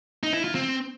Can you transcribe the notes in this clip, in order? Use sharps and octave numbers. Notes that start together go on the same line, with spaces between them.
D#4
E4
F4
C4